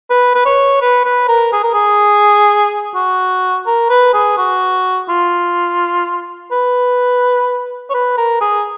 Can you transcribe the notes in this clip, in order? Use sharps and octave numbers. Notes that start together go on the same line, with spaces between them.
B4
B4
C#5
B4
B4
A#4
G#4
A#4
G#4
F#4
A#4
B4
G#4
F#4
F4
B4
C#5
B4
A#4
G#4